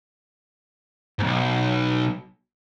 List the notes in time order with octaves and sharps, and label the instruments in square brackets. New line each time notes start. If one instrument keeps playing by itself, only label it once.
[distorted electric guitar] B1 G#2